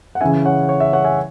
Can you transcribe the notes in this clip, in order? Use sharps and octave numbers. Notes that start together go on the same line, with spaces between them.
F#5
C#3 E3 C#4 E5 G#5
C#5 F#5
C#5
E5
C#5 F#5
E5 G#5